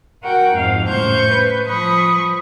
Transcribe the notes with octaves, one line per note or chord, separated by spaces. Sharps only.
F#4 A#4 F#5 G5
F2 G#2 F5
A2 C#3 C5 C#6 G6
B4
F3 B5 C#6 D#6